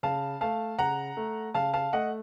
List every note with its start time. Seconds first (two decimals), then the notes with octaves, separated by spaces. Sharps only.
0.03 C#3 F5 A5
0.41 A3 F5 A5
0.78 C#3 F#5 A#5
1.17 A3
1.54 C#3 F5 A5
1.73 F5 A5
1.93 A3 D#5 F#5